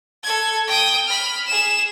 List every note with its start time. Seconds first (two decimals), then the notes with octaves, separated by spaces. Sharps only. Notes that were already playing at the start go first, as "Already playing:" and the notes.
0.23 A4 G#6
0.68 G5 D#6
1.07 B5 F6
1.47 G#4 E7